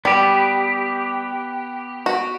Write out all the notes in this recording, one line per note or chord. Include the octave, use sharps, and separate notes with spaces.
G3 B3 G4
F#4